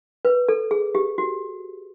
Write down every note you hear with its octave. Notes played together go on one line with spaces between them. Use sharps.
B4
A4
G#4
G4
F#4